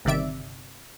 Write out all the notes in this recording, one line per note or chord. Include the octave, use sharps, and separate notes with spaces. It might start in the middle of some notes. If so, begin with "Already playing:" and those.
G1 C3 D#3 D5 E5 D7